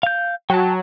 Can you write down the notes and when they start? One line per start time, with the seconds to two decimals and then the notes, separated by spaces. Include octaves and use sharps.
0.03 F5 G6
0.50 F#3 G5 A5